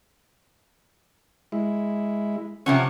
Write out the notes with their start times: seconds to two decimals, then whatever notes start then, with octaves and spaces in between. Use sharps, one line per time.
1.52 G#3 E4
2.66 C3 F3 C#4 F#5 C#6